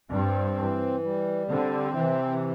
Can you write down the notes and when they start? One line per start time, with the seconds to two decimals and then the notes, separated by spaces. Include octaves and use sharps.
0.10 G2 C4
0.58 E3
1.03 G3
1.49 D3 C4
1.95 C3 E3